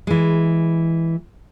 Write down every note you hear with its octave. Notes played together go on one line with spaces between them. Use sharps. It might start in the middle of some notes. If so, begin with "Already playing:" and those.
E3 G#3